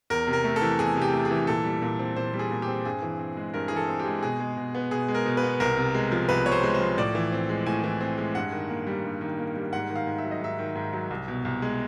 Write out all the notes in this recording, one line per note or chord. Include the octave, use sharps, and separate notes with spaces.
E2 A#4
C3
A#4
A3
A4
E3
E2 G#4
C3
G4
A3
G#4
E3
A#2 A4
G3
A#2
C4
A#2 C5
G3
G#4
A#2
G4
C4
G2 G#4
E3
C4
G#3
G2 A#4
E3 G#4
A4
C4
G4
G#3
B2 G#4
G#3
B2
B3
B2 G#4
G#3
A#4
B2
B4
B3
C2 A#4
C3
G#3
F3
C2 B4
C3 C#5
C5
G#3
C5
F3
A2 D5
E3
C4
G#3
A2 G#5
E3
C4
G#3
G2 F#5
D#3
A#3
G3
G2
D#3
A#3
G3
G#2 F#5
D#3
F5
G#2
E5
F#3
D#5
G#2 E5
D#3
G#2
F#3
C2
B2
C2
G#3